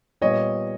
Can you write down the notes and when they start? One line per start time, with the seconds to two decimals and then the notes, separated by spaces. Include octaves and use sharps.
0.21 A#2 G3 B3 C#5 D#5